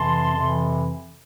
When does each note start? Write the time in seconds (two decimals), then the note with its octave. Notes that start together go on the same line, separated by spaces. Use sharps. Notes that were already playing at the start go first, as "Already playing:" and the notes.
Already playing: F2 C3 E3 A5 C6
0.36 F2 C3 E3